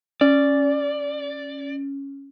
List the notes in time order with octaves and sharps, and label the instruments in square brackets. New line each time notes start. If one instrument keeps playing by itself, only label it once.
[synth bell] C#4 [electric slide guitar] D5